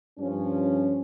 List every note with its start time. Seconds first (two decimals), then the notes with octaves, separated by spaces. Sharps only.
0.18 G2 F3 C#4